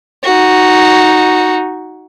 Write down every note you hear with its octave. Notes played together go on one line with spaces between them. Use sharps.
D#4 F#4